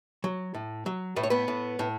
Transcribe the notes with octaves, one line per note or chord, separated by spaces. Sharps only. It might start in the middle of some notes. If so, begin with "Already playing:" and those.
F#3
A2
F#3
A2 B4
C#5
B3 B4
A2
A2